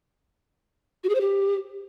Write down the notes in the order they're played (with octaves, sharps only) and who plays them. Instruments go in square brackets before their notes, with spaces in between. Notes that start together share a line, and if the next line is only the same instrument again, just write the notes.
[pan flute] F#4
G#4
C5
G4